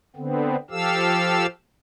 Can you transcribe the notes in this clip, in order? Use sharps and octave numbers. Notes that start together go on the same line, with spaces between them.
D3 B3 C4
F3 G4 A4 F5 E6